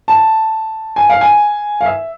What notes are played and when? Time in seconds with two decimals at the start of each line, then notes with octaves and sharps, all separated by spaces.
0.08 A5
0.96 G#5
1.09 F5
1.21 G#5
1.81 F5
1.86 E5